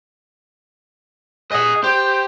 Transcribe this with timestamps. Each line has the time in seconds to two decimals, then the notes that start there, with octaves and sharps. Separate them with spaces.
1.52 G#4 D#5 F#5
1.84 G4 C5